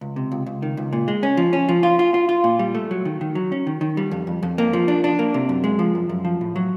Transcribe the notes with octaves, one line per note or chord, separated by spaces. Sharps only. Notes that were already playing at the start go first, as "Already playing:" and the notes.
C#2
C3
C#2
C#2
D#3
C#2
A#2
G#3
C#4
F3
C#4
F3
F4
F4
F4
F4
A#2
G3
A3
F#3
D#3
D#3
F#3
C#4
D#3
D#3
G3
F2
F2
F2
A#3
F3
D4
D4
A#3
C3
F#2
G#3
F3
F#2
F#2
F3
A2
F#3